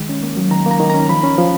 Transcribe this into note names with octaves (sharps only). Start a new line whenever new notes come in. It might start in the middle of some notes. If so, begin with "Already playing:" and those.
Already playing: D#3 G#3
C#4
A#3
F#3
D#3 A#5
A#3
A#5
D#3
C#4 A#5
F3 B5
C#4
F3